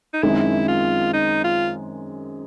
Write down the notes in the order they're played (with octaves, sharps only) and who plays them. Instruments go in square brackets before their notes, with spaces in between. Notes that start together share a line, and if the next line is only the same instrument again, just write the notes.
[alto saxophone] D#4
[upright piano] F#2 D#3 G#3 C4 [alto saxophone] E4
[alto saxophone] F4
D#4
F4